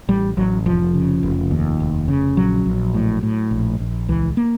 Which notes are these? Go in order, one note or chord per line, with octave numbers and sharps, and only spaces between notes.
A1 G3
A1 F#3
F1 F3
C#3
F1
D#2
F1
C#3
A#1 F#3
A#1
A2
A2
A#1
A#1
C#2 E3
A#3